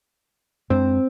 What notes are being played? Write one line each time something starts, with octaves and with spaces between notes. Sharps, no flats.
F#2 G#3 C4 D4